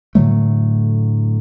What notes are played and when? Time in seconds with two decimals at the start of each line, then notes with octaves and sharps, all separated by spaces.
0.15 A2 D3 F#3 A3